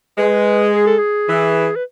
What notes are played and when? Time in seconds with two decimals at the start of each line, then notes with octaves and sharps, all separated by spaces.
0.18 G#3 B4
0.74 G#4
0.87 A4
0.99 G#4
1.28 E3
1.76 B4